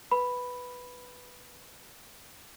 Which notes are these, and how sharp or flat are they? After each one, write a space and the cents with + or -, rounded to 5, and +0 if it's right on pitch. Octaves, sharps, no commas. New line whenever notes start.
B4 +0 B5 +0